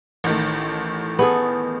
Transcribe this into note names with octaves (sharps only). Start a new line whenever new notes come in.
A1 D#3 A3
B3 G#4 A4